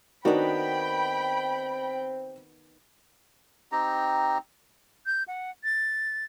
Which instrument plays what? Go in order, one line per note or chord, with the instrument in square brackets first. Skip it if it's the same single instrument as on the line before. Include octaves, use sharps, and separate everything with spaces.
[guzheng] D#3 B3 [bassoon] C4 [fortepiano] D4 D#4 F#4 [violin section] G5 B5
[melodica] C4 D#4 G4 A#5
[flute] G6
F#5
A6